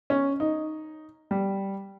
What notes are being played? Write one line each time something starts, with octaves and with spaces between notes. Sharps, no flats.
C#4
D#4
G3